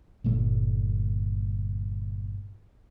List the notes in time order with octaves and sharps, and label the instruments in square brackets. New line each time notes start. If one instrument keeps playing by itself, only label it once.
[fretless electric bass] G1 A#2 A3